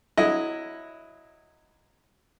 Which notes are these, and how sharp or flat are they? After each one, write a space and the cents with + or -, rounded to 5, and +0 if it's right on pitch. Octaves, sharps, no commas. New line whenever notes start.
F#3 -10 E4 +0 D#5 +0